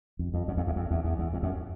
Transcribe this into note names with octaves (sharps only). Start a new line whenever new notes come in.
F2
F2
F#2
F2
E2
F2
E2
E2
E2
F2
F#2